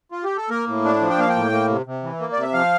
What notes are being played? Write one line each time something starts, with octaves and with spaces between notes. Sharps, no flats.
F4
G4
A4
A#3 A#4
A2
D4
F3
G5
A#3 F5
G5
A2
A#3
C3
C3
E3
A#3
C3 D5
E5
F3 F5